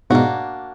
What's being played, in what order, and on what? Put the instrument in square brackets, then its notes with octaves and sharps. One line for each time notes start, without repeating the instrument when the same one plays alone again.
[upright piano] G#2 B2 [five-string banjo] A#3 D4 F#4